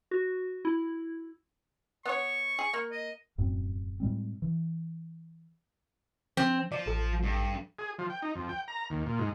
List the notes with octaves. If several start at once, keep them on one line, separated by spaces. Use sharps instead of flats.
F#4
E4
B3 C#5 C#6
G#4
A#3
D#5
E1 F#2 A2 C4
A2 G3 G#3 C4
E3
F3 C4
F3 D5
A1 A4
G2
G#4
F3
G5
D#4
F2
G5
A#5
D#2
A#2
G#2